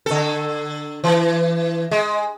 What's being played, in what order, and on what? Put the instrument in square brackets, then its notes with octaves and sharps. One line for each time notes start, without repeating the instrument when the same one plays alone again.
[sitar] D3 A4
E3
G#3